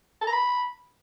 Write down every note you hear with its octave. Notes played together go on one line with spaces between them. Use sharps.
A5
A#5
B5